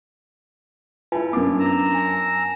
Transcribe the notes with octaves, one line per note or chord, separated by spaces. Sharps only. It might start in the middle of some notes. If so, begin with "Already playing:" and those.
E4 F4 B4 G#5 A5
F#2 B3 D4 D6
A#5 E6
G#5
A5